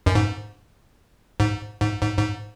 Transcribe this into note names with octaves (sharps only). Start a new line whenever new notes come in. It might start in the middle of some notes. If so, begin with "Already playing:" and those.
F#2
G#2
G#2
G#2
G#2
G#2